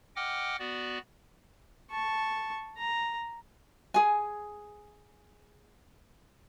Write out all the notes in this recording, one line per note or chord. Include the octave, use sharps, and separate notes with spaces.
D#5 F#5 G5 D6 F6
B3 F#4 D5
A5 C#6
A#5
G#4 G#5